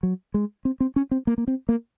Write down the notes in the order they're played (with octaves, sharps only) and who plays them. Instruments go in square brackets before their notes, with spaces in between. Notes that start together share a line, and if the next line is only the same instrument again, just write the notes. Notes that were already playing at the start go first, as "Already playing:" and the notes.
[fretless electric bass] F#3
G#3
C4
C4
C#4
C4
A#3
A#3
C4
A#3